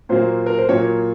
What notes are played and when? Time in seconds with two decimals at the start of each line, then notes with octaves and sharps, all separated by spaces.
0.09 A#2 F#3 A#3 C5
0.46 A#4
0.58 C5
0.69 A#2 F#3 A#3 C#5